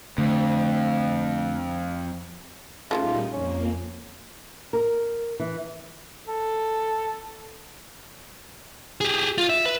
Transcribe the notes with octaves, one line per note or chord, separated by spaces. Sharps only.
F2 D3 A3
A#2 C#3 F#3 G3 A3 D#4 F4
F2 A#3 C#4
A#4
E3
A4
G4 G#4
F4
E5
B4